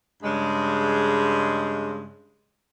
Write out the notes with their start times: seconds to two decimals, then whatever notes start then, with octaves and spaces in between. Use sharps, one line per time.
0.23 G2 C#3 G#3